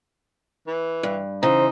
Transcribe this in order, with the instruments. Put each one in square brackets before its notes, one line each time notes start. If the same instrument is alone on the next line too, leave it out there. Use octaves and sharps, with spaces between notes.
[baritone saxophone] E3
[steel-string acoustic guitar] G2
[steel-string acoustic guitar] C#3 E3 [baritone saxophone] D#4 [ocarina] C5